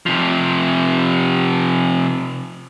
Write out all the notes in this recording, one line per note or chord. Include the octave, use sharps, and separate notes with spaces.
C3 F3